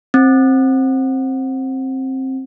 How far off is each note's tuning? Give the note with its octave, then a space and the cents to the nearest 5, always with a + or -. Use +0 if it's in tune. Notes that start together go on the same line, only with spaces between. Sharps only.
C4 +15